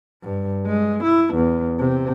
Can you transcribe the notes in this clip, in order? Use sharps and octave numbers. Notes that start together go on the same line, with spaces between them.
G2
G#3
E4
E2
C3